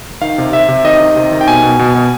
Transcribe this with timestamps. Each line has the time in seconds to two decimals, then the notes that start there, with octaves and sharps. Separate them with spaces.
0.21 D#3 F5
0.38 C3
0.53 C3 E5
0.68 C3
0.84 D#3 D#5
1.01 D#3
1.16 C3
1.32 D#3
1.41 G5
1.47 B2 G#5
1.63 B2
1.79 B2
1.95 B2